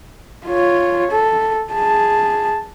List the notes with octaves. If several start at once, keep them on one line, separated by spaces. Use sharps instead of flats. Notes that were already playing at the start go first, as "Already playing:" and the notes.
F4 C#5
A4
G#4 A5